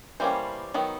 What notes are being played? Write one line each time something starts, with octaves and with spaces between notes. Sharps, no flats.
E3 G3 A#3 C#4 C5
D#3 F#3 B3